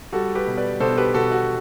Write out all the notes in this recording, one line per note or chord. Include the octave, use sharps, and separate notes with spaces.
G3 F#4 A4
G4 B4
B2
B4 D5
B2 A4 C5
G4 B4
B2 F#4 A4
F#4